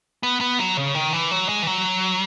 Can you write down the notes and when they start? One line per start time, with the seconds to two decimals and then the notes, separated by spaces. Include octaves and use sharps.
0.23 B3
0.41 B3
0.59 F#3
0.77 C#3
0.95 D#3
1.13 E3
1.31 F#3
1.49 G#3
1.63 E3
1.67 F#3